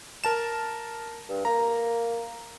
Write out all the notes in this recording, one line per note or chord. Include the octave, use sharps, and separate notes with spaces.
A#4 A5 E7
G2
A#3 A#5